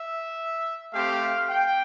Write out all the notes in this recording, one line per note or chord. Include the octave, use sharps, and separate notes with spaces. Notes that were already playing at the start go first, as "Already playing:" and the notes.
Already playing: E5
A3 C4 G4 F5
G5